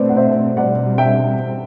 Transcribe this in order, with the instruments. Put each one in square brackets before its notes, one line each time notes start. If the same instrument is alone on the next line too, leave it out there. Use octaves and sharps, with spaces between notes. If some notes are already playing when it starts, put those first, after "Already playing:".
Already playing: [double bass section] B2 A3 C4 [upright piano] B4 C5 D5
[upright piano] F#5
C5 E5
[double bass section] B2 G3 C4 [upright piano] D5 F#5
[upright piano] E5 G5